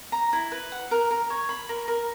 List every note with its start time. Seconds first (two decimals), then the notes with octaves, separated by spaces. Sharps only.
0.12 A#5
0.33 E4
0.52 B4
0.72 F#5
0.91 A#4
1.11 A#4
1.30 C#5
1.49 B5
1.69 A#4
1.88 A#4